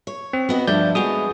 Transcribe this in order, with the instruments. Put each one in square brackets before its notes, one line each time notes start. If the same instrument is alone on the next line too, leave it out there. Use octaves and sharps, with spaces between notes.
[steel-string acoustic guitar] C#5
[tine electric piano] C4
[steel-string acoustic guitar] B3 F#4 D#5
[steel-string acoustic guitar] G2 F3 A3 [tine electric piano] D5 G6
[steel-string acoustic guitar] G#3 B3 [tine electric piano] F#4 G#4 D#6